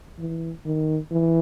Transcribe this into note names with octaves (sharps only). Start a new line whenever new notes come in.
E3
D#3
E3